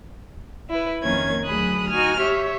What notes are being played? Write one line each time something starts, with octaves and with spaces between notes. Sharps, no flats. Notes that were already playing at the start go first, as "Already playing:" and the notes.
E4 B4
F2 D#3 A#3 C#4 G#6
D2 F#3 G#4 B5 D#6 F#6
D#4 F#4 G#5 F6
G4 C#5 E5